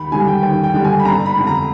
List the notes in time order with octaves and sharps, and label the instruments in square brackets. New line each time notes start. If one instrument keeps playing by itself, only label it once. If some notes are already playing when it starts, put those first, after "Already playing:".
Already playing: [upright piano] D#2 B5
D3 G3 G#5
G5
D#2 G5
G5
D3 G3
G#5
B5
G1 A#5
B5
F2 D3
A#5